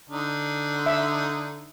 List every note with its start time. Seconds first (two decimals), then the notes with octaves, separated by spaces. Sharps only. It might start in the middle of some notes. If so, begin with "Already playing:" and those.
0.09 D3 D#4
0.86 E5